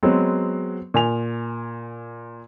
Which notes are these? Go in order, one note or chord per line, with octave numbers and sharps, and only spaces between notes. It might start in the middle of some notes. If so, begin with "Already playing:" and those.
F#3 G#3 B3 C4
A#2 G#5 F7